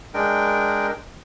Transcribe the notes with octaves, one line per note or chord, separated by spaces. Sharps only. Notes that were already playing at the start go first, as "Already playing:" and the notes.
G#3 D4 A#4 G5